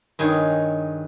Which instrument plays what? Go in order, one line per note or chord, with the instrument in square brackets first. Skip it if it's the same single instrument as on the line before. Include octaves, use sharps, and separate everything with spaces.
[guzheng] G2 D#3 G#4 C#5